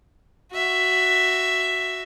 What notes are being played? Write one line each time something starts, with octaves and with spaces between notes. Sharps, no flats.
F#4 E5